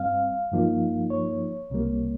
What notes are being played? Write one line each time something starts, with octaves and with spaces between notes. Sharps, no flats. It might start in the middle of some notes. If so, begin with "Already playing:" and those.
Already playing: G2 G3 C4 F5
G2 F3 A#3 D#4
C#5
C2 C3 G3 A#3